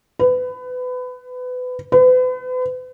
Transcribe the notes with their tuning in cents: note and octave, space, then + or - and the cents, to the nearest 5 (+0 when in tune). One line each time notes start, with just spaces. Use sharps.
B4 +25
B4 +40